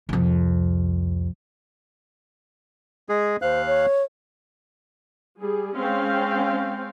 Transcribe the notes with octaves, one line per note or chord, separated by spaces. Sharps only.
C2 F2
G#3 G#4
D#2 C5 F5 F#6
C#5
G3 G#4
G#3 C4 C#4 F5 G5